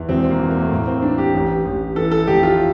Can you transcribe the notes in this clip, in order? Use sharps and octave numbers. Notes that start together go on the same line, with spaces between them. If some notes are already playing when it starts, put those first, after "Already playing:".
Already playing: E2 E3
E1 C4
A#3
E2
A#3
A3
A2 A#3
C4
E3 D4
G4
A1
A1
E3 A4
A4
F1 G4
F4